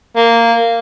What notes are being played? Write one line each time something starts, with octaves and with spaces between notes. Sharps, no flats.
A#3